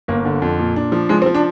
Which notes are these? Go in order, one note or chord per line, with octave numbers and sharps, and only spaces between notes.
G1 A#3
D3
F2
A#2
D4
F3
F3 G#3
C4
F3
D4